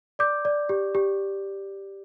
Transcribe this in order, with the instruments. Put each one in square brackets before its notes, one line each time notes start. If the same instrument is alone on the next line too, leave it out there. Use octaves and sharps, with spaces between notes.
[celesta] D5 D6 G6
D5
G4
G4